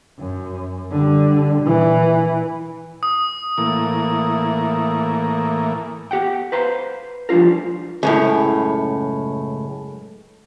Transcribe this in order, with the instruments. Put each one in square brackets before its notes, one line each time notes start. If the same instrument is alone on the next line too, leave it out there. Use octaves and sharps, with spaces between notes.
[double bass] F#2
D3 G3
A#2 E3
[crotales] D#6
[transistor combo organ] A2 E3 A#3
[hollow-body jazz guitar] B3 G4 F#5 G5
B4 C5 F5 A#5 C6
F3 G3 D4 F4 A#4
C#2 F#2 A2